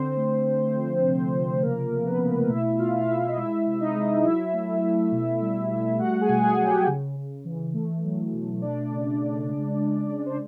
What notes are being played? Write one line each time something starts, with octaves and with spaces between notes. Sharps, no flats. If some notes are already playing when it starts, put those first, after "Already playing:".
Already playing: D3 C4 C5
A3
D3
F3
C3
F3
C#3 A#3 A#4
A3
B3 B4
A3
B2 E4 E5
B2 F4 F5
F5
B2 E4 E5
D#5
G#3 E4 E5
C3
E5
D#4 D#5
G#3
F#3 E4 E5
A3
A3
B2
G3
G3
A3 F#4 F#5
G#4 G#5
B2
G#4 G#5
F#3
G4 G5
C#3
C#3
E3
A3
F#3
B2
A3 D4 D5
C#3
C#3
G#3
G#3
G#3
C5